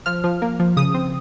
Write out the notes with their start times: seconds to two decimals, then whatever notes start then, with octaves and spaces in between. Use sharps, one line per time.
0.06 F3 F6
0.24 F3
0.42 A#3
0.60 F3
0.77 C#3 D#6
0.94 C4